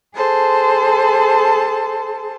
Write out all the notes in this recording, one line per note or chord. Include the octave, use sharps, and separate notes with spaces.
G#4 A4 C5 A5